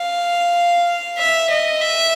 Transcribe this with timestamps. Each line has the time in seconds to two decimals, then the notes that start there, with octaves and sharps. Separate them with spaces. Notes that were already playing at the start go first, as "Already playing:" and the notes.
Already playing: F5
1.19 E5
1.50 D#5
1.82 E5